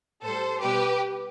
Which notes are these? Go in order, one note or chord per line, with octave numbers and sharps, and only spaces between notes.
A2 G3 A4 C5
B2 G3 G4 B4